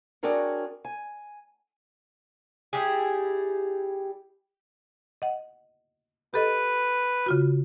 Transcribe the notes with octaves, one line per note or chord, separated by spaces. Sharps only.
C4 D4 F#4 G#4 A#4 C#5
G#5
G3 E4 G4 G#4
D#5 F#5
G4 A4 B4 D#5
C#3 F4 F#4